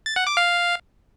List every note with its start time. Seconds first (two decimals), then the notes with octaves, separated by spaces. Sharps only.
0.06 A6
0.16 F#5
0.27 D6
0.37 F5